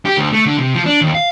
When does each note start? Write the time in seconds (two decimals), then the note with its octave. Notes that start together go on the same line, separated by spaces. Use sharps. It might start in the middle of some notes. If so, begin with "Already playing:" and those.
0.05 G4
0.17 D2
0.33 A3
0.46 D3
0.59 C3
0.74 F3
0.86 D4
1.01 D#2
1.15 F5